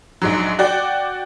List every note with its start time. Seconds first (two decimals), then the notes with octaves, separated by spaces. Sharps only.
0.22 A#1 G#2 F#3
0.59 F#4 D5 G5